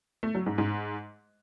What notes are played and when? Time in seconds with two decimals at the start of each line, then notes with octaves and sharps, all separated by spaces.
0.23 A3
0.35 F#3
0.46 G#2
0.58 G#2